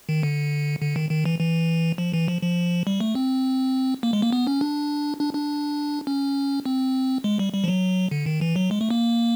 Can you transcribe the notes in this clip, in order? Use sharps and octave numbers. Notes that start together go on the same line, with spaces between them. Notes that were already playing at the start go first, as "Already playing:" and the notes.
D#3
D3
D3
D#3
D#3
E3
E3
F3
E3
F3
F3
G3
A3
C4
A#3
G#3
A#3
B3
C#4
D4
D4
D4
C#4
C4
G#3
G3
G3
F3
F#3
D3
D#3
E3
F#3
G#3
A3
A#3